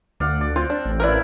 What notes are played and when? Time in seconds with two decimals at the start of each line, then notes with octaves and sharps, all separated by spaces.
0.20 D2 D5 F5 F#5
0.41 D5
0.56 C4 F4
0.70 D4
0.85 A1
1.00 A#3 E4 A#4 B4 D5